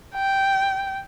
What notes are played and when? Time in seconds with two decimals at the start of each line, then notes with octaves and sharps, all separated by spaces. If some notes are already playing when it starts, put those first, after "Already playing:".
0.15 G5